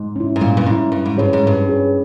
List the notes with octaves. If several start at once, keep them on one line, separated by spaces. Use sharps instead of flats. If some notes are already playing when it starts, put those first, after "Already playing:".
Already playing: G#2
C#4 E4
G#2
A#2 G3
G2
G#2 C#4 E4
G2 G3
G#2
G2 C#4 G#4 C#5
G#2
G2 G3
C#4 G#4 C#5